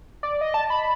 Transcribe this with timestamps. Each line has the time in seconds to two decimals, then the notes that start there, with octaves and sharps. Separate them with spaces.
0.23 D5
0.41 D#5
0.54 A5
0.70 B5